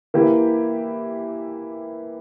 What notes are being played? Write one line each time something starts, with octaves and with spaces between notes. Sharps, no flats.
E3 A#3 E4 G4